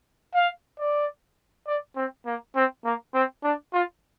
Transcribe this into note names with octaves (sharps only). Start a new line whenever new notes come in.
F5
D5
D5
C4
A#3
C4
A#3
C4
D4
F4